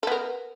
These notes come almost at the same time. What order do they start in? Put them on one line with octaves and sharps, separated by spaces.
A4 B3 A#4